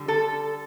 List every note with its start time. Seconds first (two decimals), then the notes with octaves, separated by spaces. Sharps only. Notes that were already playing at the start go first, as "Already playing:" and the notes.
Already playing: D3 G3
0.08 A4